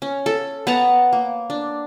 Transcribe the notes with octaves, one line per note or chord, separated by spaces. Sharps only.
C#4
A4
B3 F#5 A5 A#5
A#3
D4